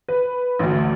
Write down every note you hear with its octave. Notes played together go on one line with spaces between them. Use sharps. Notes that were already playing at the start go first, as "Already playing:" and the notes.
B4
A1 D2